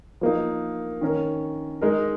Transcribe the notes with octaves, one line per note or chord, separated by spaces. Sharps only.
F3 A#3 D#4
D#3 C#4 A#4
G#3 D#4 A#4